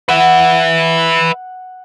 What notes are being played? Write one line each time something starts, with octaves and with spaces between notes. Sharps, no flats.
B4 E5 F#5